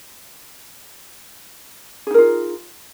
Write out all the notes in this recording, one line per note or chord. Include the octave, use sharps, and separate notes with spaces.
D#4 F4 G#4 A#4